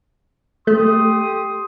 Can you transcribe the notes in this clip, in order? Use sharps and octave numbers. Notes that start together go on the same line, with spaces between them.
A3 G4 C6 D#6